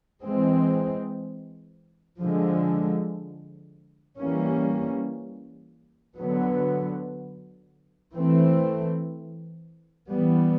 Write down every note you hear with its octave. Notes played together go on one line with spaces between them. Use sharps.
E3 G#3 C4
D3 F3 G#3
E3 G3 A#3 C#4
D3 F#3 B3
E3 A3 C4
E3 G3 B3